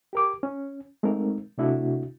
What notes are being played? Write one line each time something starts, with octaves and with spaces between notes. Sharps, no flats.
G4 A#4 D6
C#4
G#3 A3 C4 D#4 A#4
C3 A3 D4 E4 F#4